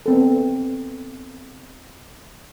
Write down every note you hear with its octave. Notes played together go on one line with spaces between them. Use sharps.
B3 C4 A4